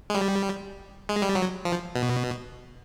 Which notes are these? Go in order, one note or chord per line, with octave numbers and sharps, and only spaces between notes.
G#3
G3
G#3
G3
F#3
F3
B2